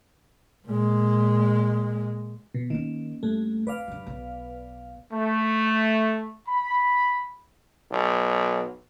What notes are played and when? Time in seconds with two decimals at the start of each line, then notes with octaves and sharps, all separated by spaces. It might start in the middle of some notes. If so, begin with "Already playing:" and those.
0.67 A#2 G#3
2.54 B2
2.70 D#3 A#3 C#4
3.23 G2 A3
3.67 F2 B4 D5 F5
3.88 G2 F#3
4.06 B1
5.12 A3
6.47 B5
7.91 B1